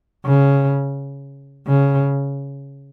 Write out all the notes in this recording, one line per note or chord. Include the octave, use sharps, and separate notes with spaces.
C#3
C#3